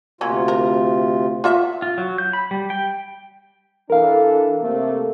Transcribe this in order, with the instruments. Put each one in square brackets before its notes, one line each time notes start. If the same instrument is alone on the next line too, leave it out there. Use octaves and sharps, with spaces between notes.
[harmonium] D2 C3 F4 [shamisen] F#3 A#3 C#4
[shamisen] A#4
F4 F#4 E5
[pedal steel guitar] F4
F#3
G6
B5
G3
G5
[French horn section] E3 D4 A4 [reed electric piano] A#4 F5
[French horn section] C3 A3 A#3